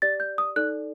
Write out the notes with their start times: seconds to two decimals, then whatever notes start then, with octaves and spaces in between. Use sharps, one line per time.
0.02 G4 D5 A6
0.20 G6
0.38 D#6
0.56 D#4 A4 D5 F#6